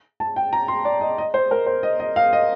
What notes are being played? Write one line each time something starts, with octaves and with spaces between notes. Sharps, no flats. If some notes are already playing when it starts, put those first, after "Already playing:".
A5
G5
A#5
C6
D5
D#5
D#5
C5
A#4
C5
D#5
D#5
F5
D#5